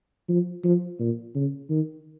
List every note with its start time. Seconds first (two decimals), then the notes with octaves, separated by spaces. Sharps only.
0.29 F3
0.64 F3
1.00 A#2
1.35 C#3
1.70 D#3